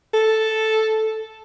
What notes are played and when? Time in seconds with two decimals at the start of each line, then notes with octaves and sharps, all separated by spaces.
0.14 A4